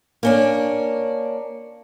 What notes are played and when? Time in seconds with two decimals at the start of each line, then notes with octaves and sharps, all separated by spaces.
0.23 A#3 C#4 D4